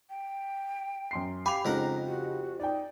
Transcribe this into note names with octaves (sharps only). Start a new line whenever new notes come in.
G5
F#2 C6 C7
G4 F5 G#5 B5 D6 F7
F2 C#3 G#3 D#4 A#4 F#5 A#5
F#4
D#4 D5 G5